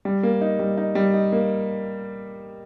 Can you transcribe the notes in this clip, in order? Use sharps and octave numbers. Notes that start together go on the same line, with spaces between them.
G3
A#3
D#4
G3
D#4
G3
D#4
A#3